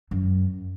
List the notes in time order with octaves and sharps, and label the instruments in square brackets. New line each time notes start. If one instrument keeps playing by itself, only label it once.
[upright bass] F#2